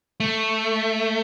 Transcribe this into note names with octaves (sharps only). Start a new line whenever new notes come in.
A3